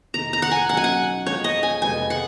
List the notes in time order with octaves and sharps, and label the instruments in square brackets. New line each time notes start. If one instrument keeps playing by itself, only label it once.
[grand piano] F1 F2 D#3 [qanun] A#5
[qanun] A#5
F#5
G#5
[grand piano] B1 B2 F#3 C#4 [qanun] F#5
[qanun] G#5
F#5
[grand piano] F2 F3 G#3 [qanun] C#5
[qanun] D#5
G#5
[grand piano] F1 F2 F3 G#3 B3 [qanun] G#5
[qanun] F#5